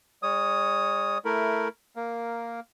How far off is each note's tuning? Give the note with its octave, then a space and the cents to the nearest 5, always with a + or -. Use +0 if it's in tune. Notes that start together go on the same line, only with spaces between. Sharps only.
G#3 -45 C#5 +0 D#6 +0
A3 +0 E4 +0 A#4 +0
A#3 +0 A#4 +0